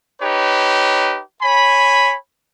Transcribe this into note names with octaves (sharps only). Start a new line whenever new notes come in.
D#4 G4 B4 C#5
C#5 G#5 B5